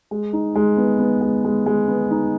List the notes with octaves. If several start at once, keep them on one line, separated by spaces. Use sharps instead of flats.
G#3
D#4
G#3
B3
B3
G#3
G#3
G#3
B3
D#4